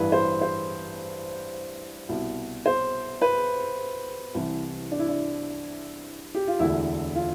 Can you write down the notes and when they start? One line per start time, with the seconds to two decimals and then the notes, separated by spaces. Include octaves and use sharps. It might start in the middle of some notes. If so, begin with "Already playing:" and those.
Already playing: A1 G2 E3 B4
0.12 C5
0.41 C5
2.09 C2 B2
2.66 C5
3.22 B4
4.35 C2 C3 E3
4.92 D4
4.99 E4
5.09 D4
6.35 G4
6.48 F4
6.59 E1 D2 D3 E4
7.15 F4